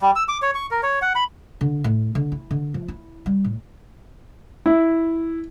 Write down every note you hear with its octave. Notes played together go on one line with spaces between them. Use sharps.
G3
E6
D6
C#5
C#6
A#4
C#5
F#5
B5
D3
A2
D3
E4
D3
F3
E4
G3
A2
E4